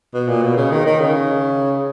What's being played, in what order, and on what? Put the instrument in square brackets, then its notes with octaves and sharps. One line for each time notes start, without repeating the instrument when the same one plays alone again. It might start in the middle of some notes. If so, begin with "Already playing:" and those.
[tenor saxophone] B2
A#2
B2
C#3
D#3
D#3
C#3